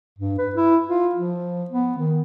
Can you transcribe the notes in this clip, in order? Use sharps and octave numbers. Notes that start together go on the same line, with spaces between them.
G2
B4
E4
F4
F3
B3
D#3